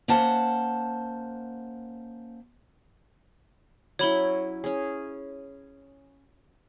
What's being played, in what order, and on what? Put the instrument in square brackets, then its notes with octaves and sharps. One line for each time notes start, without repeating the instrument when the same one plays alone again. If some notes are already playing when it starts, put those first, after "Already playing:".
[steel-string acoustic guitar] A#3 C#4 C5 F#5 A5
[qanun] F#3 C#4 E4 [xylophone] C#5 B5 G7
[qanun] C#4 G#4